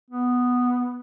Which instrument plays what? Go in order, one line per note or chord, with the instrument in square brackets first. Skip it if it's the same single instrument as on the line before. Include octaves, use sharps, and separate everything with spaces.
[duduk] B3